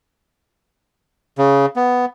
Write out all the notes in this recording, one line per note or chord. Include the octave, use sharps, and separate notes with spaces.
C#3
B3